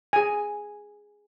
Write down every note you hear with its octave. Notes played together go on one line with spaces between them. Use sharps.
G#4 G#5